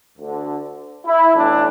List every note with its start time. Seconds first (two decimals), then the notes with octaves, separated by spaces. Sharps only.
0.18 D2 D3
1.06 E4
1.35 B1 A2 E3 D4